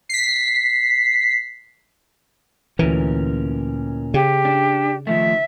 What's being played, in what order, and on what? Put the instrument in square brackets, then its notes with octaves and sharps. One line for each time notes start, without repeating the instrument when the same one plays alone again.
[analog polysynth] B6 C7
[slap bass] D2 E3 [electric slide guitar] A#2 C#4 A#4
[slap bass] C#3 [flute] G4
[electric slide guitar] D4
[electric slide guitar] D#3 F3 A3 [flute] E5